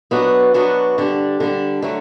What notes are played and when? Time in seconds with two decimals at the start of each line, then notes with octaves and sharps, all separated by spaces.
0.11 B2 F#3 B3 D4 F#4
0.54 B2 F#3 B3 D4 F#4
0.98 D3 G3 D4
1.40 D3 G3 D4
1.82 D3 F#3 A3